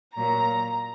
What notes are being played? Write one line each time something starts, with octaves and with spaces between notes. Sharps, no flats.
A#2 F#3 A#3 A#5